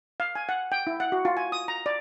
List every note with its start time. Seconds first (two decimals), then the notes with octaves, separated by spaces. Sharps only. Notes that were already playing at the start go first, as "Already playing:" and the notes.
0.20 F5
0.35 G#5
0.49 F#5
0.72 G5
0.87 E4
1.00 F#5
1.12 F#4
1.25 F4
1.37 G#5
1.52 D#6
1.68 A#5
1.86 D5